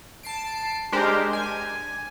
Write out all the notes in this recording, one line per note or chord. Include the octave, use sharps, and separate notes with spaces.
A5 C7 D7
G#3 D4 G4 A#4 C5
G#5